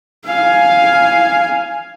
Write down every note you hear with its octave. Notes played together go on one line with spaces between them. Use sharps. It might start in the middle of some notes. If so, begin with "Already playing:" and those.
F5 G#5